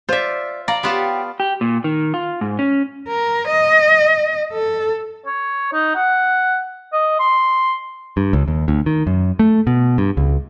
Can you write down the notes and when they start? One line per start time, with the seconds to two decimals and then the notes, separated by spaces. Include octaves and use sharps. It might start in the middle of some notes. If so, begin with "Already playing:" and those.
0.09 F4 C5 D5 E5
0.68 D5 F5 A#5
0.83 B3 F4 G4 C#5 F#5 A5
1.40 G4
1.61 A#2
1.84 D#3
2.14 F4
2.41 G#2
2.59 C#4
3.08 A#4
3.48 D#5
4.53 A4
5.26 C#5
5.73 D#4
5.95 F#5
6.93 D#5
7.19 C6
8.17 G2
8.33 C#2
8.48 D#2
8.68 D2
8.86 D#3
9.07 F#2
9.39 A3
9.67 B2
9.98 G2
10.17 C#2